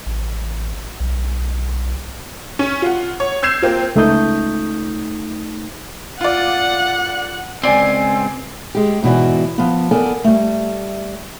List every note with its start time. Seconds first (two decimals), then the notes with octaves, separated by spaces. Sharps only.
0.06 A1
1.00 B1
2.59 C#4
2.82 F4 F#5
3.20 C#5
3.43 E6 G6 G#6 C7 E7
3.62 A#3 C4 F4
3.96 C#2 A3 D#4 D#6 G6
6.21 F4 D5 F#5
7.63 C#2 C4 D5 G#5
8.75 G#3 G4
9.02 G#2 B2 E3 F#4 D5
9.58 F3 B3
9.91 B3 A4 A#4 D5 G#5
10.24 G3 A3